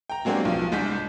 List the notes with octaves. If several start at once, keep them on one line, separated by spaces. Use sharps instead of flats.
G5 A#5
F#3 G#3 A#3 C4 D4 G4
B1 F3
C2 G#3 D4 D5 G6 B6